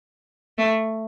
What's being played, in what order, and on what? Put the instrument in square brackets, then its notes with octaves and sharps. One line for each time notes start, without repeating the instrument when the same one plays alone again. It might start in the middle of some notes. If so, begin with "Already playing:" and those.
[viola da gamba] A3